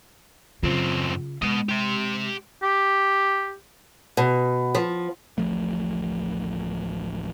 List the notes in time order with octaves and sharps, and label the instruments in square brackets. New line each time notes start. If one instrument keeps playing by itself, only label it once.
[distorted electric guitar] F#2 C4 [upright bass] C#3 F4
[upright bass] G#3 [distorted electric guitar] B3 D#5
[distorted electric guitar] G4 C6
[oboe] G4
[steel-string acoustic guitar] B2
F3
[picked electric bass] D1 A1 F3 A3